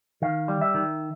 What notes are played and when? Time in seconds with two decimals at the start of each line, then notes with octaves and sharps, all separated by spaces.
0.22 D#3 F5
0.48 G3
0.61 E5
0.74 D#3